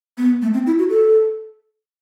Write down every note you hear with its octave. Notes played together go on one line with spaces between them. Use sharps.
B3
A3
C4
E4
F#4
A4